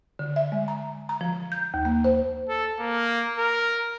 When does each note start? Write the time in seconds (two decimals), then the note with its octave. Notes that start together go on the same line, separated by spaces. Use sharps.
0.19 D3
0.36 E5
0.52 G#3
0.68 A#5
1.09 A#5
1.21 F3
1.52 G6
1.74 D#2
1.85 A#3
2.04 C5
2.49 A4
2.79 A#3
3.38 A#4